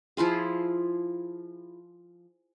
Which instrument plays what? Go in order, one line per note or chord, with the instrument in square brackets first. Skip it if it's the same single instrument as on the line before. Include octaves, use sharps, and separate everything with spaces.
[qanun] F3 E4 F4 G#4